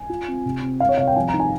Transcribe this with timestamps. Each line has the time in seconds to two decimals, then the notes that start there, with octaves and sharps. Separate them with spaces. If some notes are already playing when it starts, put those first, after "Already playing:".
Already playing: G#5
0.10 F4
0.28 C4
0.45 C3
0.62 C4
0.80 C4 F5
0.89 C#5
0.98 C3 F5
1.07 G5
1.16 F3 G#5
1.28 A#5
1.33 D#4
1.40 G#5